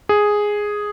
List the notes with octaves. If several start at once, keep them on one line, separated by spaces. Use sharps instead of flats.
G#4